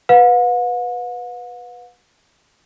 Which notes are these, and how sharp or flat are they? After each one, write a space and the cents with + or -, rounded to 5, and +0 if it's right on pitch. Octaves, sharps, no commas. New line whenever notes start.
B4 +0 F#5 -45